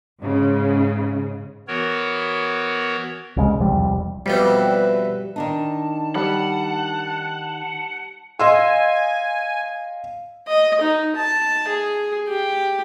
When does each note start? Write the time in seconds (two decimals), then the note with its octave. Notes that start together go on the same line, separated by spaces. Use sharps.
0.22 G#2 C#3
1.68 E3 B3 F#4 A#4 C#5
3.37 C2 C#3 E3 G#3
3.60 E1 C2 F2 G3
4.26 F2 B2 G3 C4 B4 E5
5.36 D#3 D4 D#4 A5
6.15 G3 F#5
8.40 D#5 F5 G#5 C6 E6
10.48 D#5
10.81 D#4
11.16 A5
11.68 G#4
12.28 G4